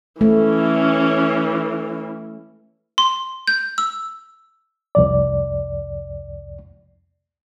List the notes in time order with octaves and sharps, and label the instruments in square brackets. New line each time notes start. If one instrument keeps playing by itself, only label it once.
[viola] E3 C#4 [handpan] A3
[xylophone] C6
G6
E6
[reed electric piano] C2 F2 D5